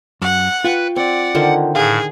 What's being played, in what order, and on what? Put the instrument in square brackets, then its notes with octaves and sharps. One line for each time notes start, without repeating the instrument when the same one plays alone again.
[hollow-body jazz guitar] F#2 [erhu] F#5
[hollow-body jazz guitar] F4 [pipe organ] B4 [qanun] G5 C#6
[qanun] C4 [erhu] D5 [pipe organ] F#5
[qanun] D3 D#3 C5 [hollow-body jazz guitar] F4 D#5
[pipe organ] A2 [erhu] G#4 [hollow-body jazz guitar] F5